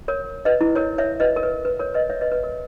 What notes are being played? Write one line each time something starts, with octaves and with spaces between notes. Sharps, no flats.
A#4 C#5
B4 D#5
E4
A#4 C#5
C#5 E5
B4 D#5
A#4
B4
B4
A#4 C#5
B4 D#5
C#5 E5
B4 D#5
B4
A#4